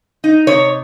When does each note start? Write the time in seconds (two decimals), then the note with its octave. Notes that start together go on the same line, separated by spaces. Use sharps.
0.24 D#4
0.47 C3 C#5